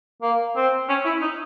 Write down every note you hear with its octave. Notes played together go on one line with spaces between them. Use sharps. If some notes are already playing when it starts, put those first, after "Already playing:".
A#3
C4
C#4
E4
D#4